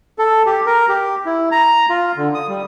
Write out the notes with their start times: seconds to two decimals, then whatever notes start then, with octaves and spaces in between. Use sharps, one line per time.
0.19 A4
0.46 G4
0.66 A#4
0.89 G4
1.26 E4
1.52 A#5
1.89 F4
2.17 D3
2.34 D#6
2.48 G3